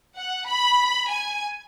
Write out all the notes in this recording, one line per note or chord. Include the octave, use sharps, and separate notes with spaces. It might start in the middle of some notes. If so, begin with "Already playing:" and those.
F#5
B5
G#5